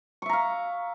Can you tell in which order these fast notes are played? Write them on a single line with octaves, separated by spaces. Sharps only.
C#6 E5 A#5 F5